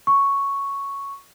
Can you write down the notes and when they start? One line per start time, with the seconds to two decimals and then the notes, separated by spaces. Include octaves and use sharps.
0.07 C#6